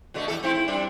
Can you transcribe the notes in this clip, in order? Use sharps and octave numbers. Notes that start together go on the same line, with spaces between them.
B2 D3 A3
E2 A3 A4
A3 C4 E4
E4
G3 C4 D4